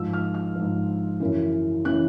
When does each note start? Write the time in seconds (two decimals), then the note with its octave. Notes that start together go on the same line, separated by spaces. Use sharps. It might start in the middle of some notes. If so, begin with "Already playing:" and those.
Already playing: G#2 F3 E6
0.13 F6
0.34 F6
0.56 G#2 F3
1.20 F#2 C#3 E3
1.85 C#3 E3 F#6